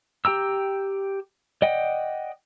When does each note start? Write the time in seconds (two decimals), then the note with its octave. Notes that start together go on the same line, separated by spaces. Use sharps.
0.25 G4 G5 A#5 E6
1.62 D5 D#5 F#5 G5